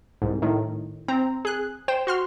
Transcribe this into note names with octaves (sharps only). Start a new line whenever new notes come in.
C2 G#2
A2 D#3
C4 A#5
G#4 F#6
C5 G5 E7
F#4 C6 F6